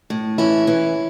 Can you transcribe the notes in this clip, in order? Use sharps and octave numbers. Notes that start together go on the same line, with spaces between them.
A2
E3 C#4 E4
E3